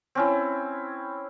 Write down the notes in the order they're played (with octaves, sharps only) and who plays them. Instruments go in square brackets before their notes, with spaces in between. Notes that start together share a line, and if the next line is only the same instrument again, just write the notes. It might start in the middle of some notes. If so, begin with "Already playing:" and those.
[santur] C4 C#4 E4